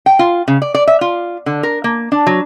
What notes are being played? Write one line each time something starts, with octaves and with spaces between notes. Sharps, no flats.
G5
F4
C#3
D5
D5
E5
F4
D3
A#4
A#3
D4
F#3